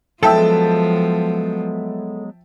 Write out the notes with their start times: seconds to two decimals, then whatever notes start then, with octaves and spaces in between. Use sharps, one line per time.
0.23 F3 F#3 G#3 B3 A4 E5 G5 A5